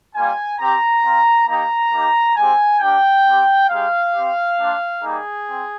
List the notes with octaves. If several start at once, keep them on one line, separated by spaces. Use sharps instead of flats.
G3 A#3 F4 G#5
C4 G4 A#5
C4 F4
A#3 D#4 G4 A#5
A#3 D#4 G4
G#3 C4 G4 G#5
A#3 D4 G4 G5
C4 G4
G#3 D#4 G4 F5
C4 G4
A#3 D4 F4
G3 A#3 D#4 G#4
C4